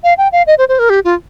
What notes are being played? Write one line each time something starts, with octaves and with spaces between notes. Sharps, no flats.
F5
G5
F5
D#5
C5
C5
A#4
G4
F4